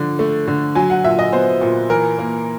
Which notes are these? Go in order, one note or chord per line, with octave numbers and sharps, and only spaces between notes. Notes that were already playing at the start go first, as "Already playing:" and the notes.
Already playing: D3 F3
A3
D3
F#3 G#5
F#5
A#2 E5
D#5
B3 C5
A#2
E3 A#4
A#3